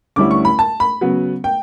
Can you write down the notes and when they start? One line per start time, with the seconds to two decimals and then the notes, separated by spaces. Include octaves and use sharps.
0.16 D2 D3 G3 C#4 E4 D6
0.31 C#6
0.45 B5
0.59 A5
0.80 B5
1.01 C#3 F#3 B3
1.44 G5